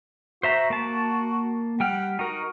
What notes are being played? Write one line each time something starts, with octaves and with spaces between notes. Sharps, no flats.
F#4 C5 E5 A#5
A#3 A5
G3 F#5 G5 F6
D#4 F#4 A#4